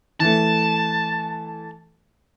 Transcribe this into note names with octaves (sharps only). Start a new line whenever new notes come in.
E3 A3 A5